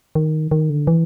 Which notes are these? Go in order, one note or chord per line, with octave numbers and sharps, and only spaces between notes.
D#3
D#3
D3
E3